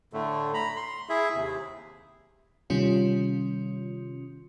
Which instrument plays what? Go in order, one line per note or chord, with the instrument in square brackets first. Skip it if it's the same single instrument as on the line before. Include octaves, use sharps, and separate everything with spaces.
[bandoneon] A2 D3 A3
A#5 B5
C6
E4 G#4 E5
D#2 C3
[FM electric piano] C3 D#3 G3 C#4 F4